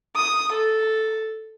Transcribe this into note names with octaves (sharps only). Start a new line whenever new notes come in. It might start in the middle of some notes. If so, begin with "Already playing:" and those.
D#6
A4